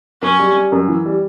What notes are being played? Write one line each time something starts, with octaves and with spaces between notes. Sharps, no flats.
F#2 C#4
G3
G3
F#2
E3
G3